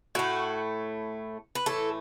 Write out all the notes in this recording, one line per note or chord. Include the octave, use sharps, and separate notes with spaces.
A2 A3 F#4
B4
A2 E3 A3 A4